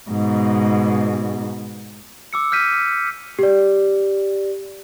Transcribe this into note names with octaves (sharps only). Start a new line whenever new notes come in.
G#2 B2
D6 E6 C#7
F6 G6 B6 D#7
G4 D5